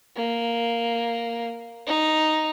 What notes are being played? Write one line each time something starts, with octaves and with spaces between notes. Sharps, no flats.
A#3
D#4